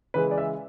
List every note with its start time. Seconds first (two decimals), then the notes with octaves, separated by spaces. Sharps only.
0.14 C#3 E3 G#3 B4
0.31 D5
0.38 E5